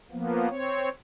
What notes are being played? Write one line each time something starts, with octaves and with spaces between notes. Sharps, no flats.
F3 A#3 B3
C4 C#5